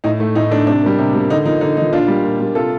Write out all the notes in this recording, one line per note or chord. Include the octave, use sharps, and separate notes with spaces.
A2 D#4
A3
A2 D#4
A3 D4
C3 D4
G3 A#3
C3
G3 A#3
D3 D#4
F3 A#3 D#4
D3 D#4
F3 A#3 D#4
A#2 D4 F4
G3 A#3
A#2
G3 A#3
C3 F4 A4